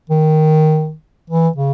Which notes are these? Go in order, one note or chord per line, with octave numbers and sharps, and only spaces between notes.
D#3
E3
C#3